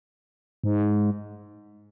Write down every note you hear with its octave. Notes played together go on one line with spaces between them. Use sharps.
G#2